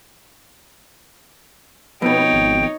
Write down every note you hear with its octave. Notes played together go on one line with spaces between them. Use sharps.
F2 B2 B3 D#4 C#5 G5
G#1